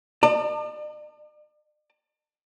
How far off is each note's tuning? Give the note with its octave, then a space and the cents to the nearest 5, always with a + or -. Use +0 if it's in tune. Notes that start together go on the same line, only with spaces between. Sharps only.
D5 +45 A5 +30